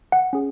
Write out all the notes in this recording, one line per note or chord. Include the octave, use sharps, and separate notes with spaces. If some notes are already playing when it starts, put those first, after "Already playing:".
F#5
C#4 G#4